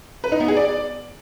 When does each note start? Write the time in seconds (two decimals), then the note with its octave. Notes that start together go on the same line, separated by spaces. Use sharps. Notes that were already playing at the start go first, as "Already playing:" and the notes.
0.24 B4
0.32 D#4
0.40 B3
0.48 G#4
0.57 D5